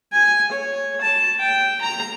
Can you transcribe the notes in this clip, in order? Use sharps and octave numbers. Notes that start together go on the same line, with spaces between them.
G#5
C#5
A5
G5
A#5